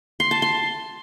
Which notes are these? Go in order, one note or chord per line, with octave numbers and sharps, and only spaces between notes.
C6
A5
C6